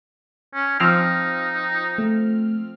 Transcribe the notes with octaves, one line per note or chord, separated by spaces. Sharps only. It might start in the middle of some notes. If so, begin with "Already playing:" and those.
C#4
F3 C4 D#4 F6
A3